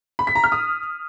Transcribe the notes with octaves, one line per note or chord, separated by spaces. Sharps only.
B5
B6
A#5
F6
D#6